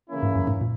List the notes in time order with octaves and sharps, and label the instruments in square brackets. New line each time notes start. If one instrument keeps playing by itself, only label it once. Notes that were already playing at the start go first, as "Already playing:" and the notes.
[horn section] C#3 E3 A#3 C#4 E4
[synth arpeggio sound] G#2
F#2
G#2
A#2